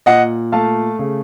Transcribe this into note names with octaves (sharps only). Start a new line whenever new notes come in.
A#2 D#5 F#5
A3 F5 A5
C#3